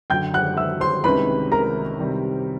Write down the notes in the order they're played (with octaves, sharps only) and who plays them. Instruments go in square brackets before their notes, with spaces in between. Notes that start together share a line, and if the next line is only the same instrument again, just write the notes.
[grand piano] F#2 D3 F#3 [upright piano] G5 G6
[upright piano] F#5 F#6
E5 E6
C5 C6
[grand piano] C2 C3 D#3 G#3 C#4 [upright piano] B4 B5
[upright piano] A#4 A#5
[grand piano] C3 D#3 G3 C4